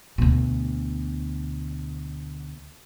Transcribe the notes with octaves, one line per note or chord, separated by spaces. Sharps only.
D2 B2